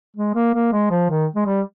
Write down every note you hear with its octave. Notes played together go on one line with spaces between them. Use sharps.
G#3
A#3
A#3
G#3
F3
D#3
G#3
G3